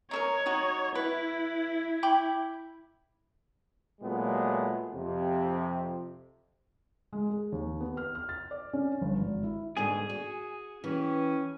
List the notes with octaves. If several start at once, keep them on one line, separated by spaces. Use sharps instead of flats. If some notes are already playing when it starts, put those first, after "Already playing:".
D#4 A4 A#4 C#5
D#4 F#4
E4 B4
G5 B5 D6
A#2 F#3 G#3 A3 B3
F2 C3
G#3
G#4
D#2
B3
F6
F6
A6
D5
C#4
G1
G#1
E4
G#2 B2 D3 G#4 G#5
F#4
E3 C#4 G4